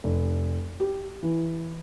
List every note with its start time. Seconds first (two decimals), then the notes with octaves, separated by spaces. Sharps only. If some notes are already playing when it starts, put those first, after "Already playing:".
0.04 F1
0.80 G4
1.23 E3